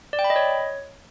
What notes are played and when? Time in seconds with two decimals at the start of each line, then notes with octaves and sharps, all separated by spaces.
0.13 D5
0.19 G5
0.24 B5
0.30 D#5
0.36 C#5